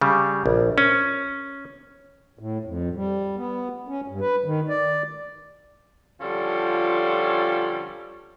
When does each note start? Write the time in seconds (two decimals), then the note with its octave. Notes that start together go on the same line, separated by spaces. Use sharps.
0.01 C#3 G3
0.46 A#1
0.78 C#4
2.39 A2
2.65 F2
2.95 G3
3.37 B3
3.88 C#4
4.08 G2
4.21 B4
4.45 D#3
4.69 D5
6.20 D3 F3 G3 C#4 F4 A4